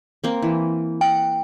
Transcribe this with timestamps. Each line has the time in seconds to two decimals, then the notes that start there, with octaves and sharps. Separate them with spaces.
0.24 A#3 C4
0.42 E3
1.01 F#5 G5